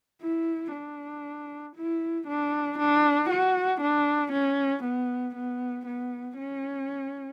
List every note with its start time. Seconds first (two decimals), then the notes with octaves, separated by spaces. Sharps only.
0.22 E4
0.73 D4
1.76 E4
2.28 D4
2.79 D4
3.30 F#4
3.81 D4
4.32 C#4
4.83 B3
5.35 B3
5.86 B3
6.38 C#4